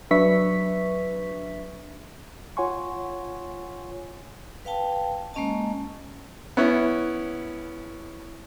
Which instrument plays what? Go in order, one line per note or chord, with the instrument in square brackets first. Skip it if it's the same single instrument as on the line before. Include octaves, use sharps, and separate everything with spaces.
[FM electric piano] F#3 D4 B4 E5 C#6 B6
[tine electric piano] F4 C#5 F#5 G#5 C6 C#6
[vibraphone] B4 F5 G5 A5
G#3 A#3 C#4 D#5 A5
[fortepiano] B3 C#4 E4